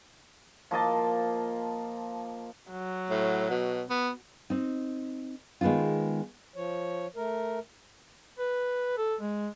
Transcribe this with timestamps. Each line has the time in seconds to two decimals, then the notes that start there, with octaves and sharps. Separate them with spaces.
0.71 F3 A#3 D#5 A5
2.71 F#3
3.10 A2
3.50 B2
3.89 B3
4.50 C4 D#4
5.61 D#3 G#3 B3 D#4 F4
6.55 F3 C#5
7.16 A3 A#4
8.39 B4
8.98 A4
9.21 G#3